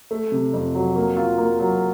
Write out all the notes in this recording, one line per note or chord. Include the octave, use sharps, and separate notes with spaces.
A3
C3
F2
F#3
A#3
F4
A#3
F#3